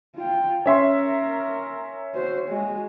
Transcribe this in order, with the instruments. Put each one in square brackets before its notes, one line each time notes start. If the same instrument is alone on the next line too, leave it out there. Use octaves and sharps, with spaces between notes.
[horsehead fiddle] F4 G5
[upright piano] C#4 E5 C6 [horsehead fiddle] A#4
[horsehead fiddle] F#4 C5
G#3 F#4